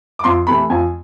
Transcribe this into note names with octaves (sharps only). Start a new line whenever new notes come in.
D6
F2 C6
C3 E3 A3 B5
F2 G#5